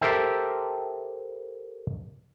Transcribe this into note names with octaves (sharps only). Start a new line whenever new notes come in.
G4 A4 A#4 C5 E5 G5